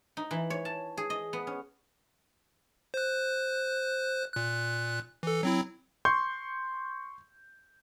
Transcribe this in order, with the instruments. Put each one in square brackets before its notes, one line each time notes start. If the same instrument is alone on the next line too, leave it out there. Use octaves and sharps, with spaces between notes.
[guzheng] D#4
E3
C#5
A5
G#4
D#5
B3
C#4
[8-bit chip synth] C5 F#6
A#2 F#6
E3 A4
F#3 C4 E4
[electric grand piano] C6 C#6 G6